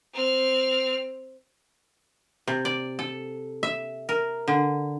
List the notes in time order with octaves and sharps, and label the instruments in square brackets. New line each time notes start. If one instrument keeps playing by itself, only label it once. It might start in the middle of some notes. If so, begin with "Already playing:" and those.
[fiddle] C4 F6
[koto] C3
D5
A4
E5
A#4
D3